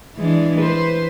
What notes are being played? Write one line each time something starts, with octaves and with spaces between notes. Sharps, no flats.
E3 G#3 D4
B4 C5